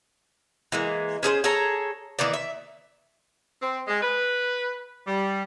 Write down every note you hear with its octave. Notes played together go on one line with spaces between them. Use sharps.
E3 G#3 A#3
C#4 G#4 A4 C5
G#4 A4 C#5 A#5
D#3 E3 A#3 D5
E5
C4
G#3
B4
G3